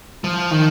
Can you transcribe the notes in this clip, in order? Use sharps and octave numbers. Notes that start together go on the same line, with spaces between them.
F3
D#3